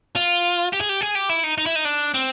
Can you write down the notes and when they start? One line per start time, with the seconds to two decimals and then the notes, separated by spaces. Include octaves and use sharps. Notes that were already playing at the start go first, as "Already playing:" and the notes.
0.16 F4
0.73 G4
0.81 G#4
0.89 G4
1.01 G#4
1.15 G4
1.29 E4
1.44 D#4
1.58 D#4
1.66 E4
1.76 D#4
1.85 D4
2.14 C4